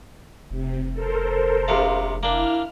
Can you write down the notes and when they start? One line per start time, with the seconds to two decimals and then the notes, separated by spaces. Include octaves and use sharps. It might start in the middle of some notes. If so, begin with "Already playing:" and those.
0.50 F1 C3
0.92 A4 A#4 C5
1.68 A#1 C3 F5
2.23 A#3 D4 E4 F6